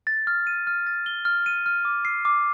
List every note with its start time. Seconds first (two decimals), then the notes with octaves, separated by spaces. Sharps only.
0.07 A6
0.27 F6
0.47 D#7
0.67 F6
0.87 A6
1.06 G7
1.25 F6
1.46 D#7
1.66 F6
1.85 D6
2.05 C7
2.25 D6